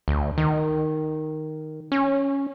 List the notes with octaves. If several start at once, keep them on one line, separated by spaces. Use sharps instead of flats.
D2
D#3
C#4